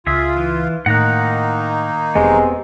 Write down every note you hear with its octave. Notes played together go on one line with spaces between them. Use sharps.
C#2 F4 G#4 E5
E3
A2 D#3 A#3 D#4 F#5 A#5 F#6
E1 G#3 B3 C4 G4